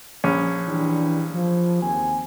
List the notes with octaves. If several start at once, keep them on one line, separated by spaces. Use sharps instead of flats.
A#1 C#4
E3 G3 D4
F3
D#2 C4 G#5